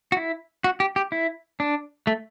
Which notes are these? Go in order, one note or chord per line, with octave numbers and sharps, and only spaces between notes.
F#4
E4
F#4
G4
G4
E4
D4
A3